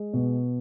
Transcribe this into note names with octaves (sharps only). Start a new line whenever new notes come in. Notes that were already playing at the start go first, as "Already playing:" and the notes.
Already playing: G#3
B2